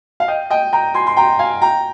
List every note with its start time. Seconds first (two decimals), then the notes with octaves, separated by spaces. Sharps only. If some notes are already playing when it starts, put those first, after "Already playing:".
0.20 F5
0.28 D#5 G5
0.50 D#5 G5
0.73 G5 A#5
0.94 G#5 C6
1.07 C6
1.17 G5 A#5
1.39 F5 G#5
1.62 G5 A#5